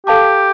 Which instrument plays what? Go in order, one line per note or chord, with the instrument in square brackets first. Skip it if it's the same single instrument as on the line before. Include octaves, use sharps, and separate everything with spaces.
[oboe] G4 [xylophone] A4 F5 A5 D6